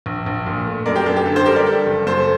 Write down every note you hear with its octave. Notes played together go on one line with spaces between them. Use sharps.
A#1
A#1
A#2
A3
F#2 A#4 D5
G4 A#4
F#2 A4
G4
D3 A4
A4 C5
G3 G4 A#4
A#4 D5
G3 A4
F#1
F#2 A4 C5